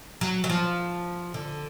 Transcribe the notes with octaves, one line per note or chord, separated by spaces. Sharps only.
F#3
F#3
F3
D3